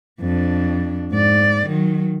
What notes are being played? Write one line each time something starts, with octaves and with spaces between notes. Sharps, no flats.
F2 D4
G#2 D5
D#3 F#3